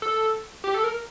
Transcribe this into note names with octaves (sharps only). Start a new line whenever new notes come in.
A4
G4
A4
A#4